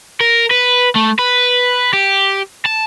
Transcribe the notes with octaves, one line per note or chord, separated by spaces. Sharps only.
A#4
B4
A3
B4
G4
A5